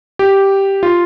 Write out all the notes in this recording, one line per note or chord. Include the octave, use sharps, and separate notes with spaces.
G4
F4